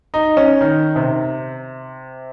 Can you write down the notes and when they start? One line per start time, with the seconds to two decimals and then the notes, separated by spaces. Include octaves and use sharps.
0.14 D#4
0.37 C#4
0.61 D#3
0.96 C3